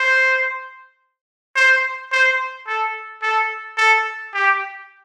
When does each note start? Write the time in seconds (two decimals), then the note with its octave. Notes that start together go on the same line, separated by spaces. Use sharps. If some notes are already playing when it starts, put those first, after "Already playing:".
Already playing: C5
1.56 C5
2.12 C5
2.67 A4
3.22 A4
3.77 A4
4.34 G4